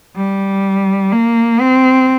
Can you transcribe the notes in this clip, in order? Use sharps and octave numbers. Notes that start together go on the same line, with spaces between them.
G3
A#3
C4